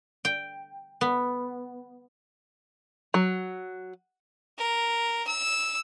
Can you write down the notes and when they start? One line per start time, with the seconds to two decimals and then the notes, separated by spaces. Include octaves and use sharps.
0.25 G5
1.01 B3
3.14 F#3
4.58 A#4
5.27 E6